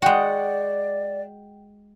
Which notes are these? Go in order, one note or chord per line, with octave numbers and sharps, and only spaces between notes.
G#3 F#4 D5 F#5 G5